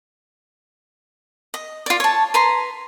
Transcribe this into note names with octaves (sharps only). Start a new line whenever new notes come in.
D#5
F4 D5
C#5 A5
B4 A#5 C6